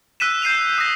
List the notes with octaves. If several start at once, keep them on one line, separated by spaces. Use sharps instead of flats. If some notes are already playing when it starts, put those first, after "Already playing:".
E6 F#6 B6 D#7 E7
G6 C7 D#7 F7
D#6 A#6